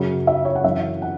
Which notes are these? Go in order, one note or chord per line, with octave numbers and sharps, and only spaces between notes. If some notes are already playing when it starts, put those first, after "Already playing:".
Already playing: F#2 C#3 F#3
E5
C#5
F#5
F#2 E3 E5
F#5